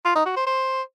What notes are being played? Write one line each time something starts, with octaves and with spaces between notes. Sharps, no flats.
F4
D#4
F#4
C5
C5